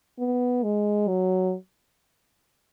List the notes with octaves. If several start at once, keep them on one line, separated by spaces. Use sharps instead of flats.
B3
G#3
F#3